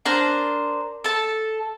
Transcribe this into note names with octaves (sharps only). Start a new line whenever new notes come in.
D4 A#4 C5 A5
A4 A5